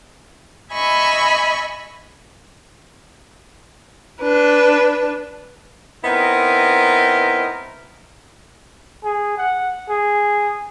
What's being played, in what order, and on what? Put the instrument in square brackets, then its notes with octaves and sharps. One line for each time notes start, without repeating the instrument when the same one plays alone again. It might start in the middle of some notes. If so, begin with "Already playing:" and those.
[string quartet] D#5 E5 G#5 B5 C#6
[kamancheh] D4 B4
[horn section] B3 C4 D#4 E4 A#4
[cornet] G#4
F#5
G#4